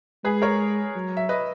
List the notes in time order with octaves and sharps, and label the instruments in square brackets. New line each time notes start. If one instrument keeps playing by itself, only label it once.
[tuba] G#3 [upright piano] G#4 B4
[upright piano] A#4 C#5
[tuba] F#3
[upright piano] E5
B4 D#5